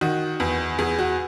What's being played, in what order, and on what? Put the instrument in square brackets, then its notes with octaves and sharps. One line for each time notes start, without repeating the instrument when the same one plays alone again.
[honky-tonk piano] D#3 F#4
E2
E2 G#4
F#4